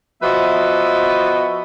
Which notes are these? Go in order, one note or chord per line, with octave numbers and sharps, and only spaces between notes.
F3 B3 F#4 B4 D#5 E5